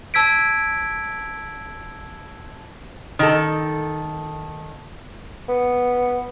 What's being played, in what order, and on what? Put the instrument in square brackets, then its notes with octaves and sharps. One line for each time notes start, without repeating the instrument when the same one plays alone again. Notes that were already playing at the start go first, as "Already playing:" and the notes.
[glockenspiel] A5 E6 G#6 B6 D7
[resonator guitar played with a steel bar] D#3 A4
[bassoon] B3